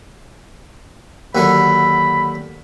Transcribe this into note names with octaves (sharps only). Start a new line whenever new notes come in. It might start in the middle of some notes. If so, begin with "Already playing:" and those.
D#2 D3 F#3 B5